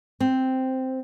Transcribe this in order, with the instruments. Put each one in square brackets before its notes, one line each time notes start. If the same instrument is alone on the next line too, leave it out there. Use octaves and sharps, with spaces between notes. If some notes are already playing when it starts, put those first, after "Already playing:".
[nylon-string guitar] C4